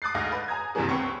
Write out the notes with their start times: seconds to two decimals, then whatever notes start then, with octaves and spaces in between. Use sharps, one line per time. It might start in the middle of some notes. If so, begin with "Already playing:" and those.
0.02 D6 D#6 F#6 A6 C7
0.14 D2 G#2 F5 A#6
0.32 B4
0.48 G#5 A#5 D#6 G#6
0.75 A#1 G2 C3 E3 A#3 G#4
0.89 C#2 B3 C4 C#6